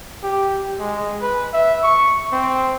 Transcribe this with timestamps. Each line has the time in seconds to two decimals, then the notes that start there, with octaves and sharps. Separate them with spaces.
0.23 G4
0.80 G#3
1.22 B4
1.53 E5
1.83 C#6
2.32 C4